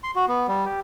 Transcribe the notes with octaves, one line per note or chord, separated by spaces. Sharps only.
C6
F#4
B3
G3
G4